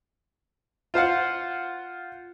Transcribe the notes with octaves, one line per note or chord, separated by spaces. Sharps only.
F4 C5 F5 F#5